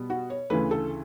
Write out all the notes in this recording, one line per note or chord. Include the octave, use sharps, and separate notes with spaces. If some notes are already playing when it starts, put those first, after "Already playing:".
Already playing: B2 G3 B3
F#4
C#5
D2 C#3 E3 A3 B4
A4